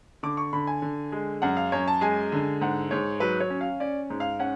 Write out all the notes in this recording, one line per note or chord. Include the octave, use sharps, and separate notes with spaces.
D3 D6
C#6
D3 B5
G#5
D3
G#3
F#2 F#5
F5
F#2 C#5
A5
G#3 G#5
D3
G#2 F#5
G#2 C#5
F#3 B4
C#5
C#4
F5
C#4 D5
G#2
F5
C#4 F#5